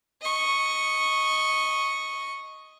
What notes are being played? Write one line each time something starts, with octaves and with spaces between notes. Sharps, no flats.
D#5 C#6